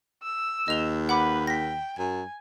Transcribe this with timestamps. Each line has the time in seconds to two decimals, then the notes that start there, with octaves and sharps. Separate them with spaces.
0.23 E6
0.68 D#2 D#5 F7 G7
1.09 B4 F#5 B5 D6
1.47 G5 A#6 B6
1.98 F#2 G#5